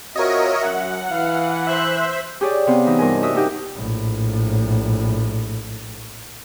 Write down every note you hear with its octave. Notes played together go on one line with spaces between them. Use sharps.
C4 F4 F#4 A#4 C#5 D#5 E5
F#2 F#5
E3 F5
C5 E5 F#6
G4 G#4 C#5 D5
C3 B3 C4 F5
E3 D#4
G2 F4 A#4 D#5 G#5
F#4 A#4 E5 D#6
D4 D#4 F#4 G4
A#1 A2